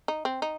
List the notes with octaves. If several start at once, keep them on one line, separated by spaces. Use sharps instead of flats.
D#4
C4
D#4